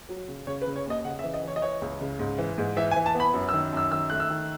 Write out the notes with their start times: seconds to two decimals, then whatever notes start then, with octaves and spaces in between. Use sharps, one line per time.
0.09 F#3
0.28 C#3
0.47 C#3 C#5
0.62 B4
0.67 C#3
0.76 C#5
0.86 D#2 D#5
1.05 C#3 F#5
1.19 E5
1.24 E3
1.34 D#5
1.43 E3 C#5
1.56 D#5
1.62 E3 C#5
1.82 C#2
2.01 C#3
2.19 G#2
2.38 E3
2.58 G#2
2.77 E3 E5
2.91 G#5
2.96 E3
3.06 A5
3.15 B3
3.20 B5
3.34 F#2
3.49 E6
3.53 D#3
3.73 F#2 E6
3.92 D#3 E6
4.10 A3 F#6
4.20 E6
4.30 D#3